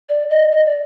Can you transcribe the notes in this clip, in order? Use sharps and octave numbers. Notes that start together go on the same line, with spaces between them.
D5
D#5
D#5
D5